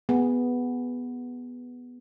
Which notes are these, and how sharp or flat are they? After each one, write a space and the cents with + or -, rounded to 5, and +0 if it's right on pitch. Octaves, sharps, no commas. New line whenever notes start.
B3 +0 G#4 -15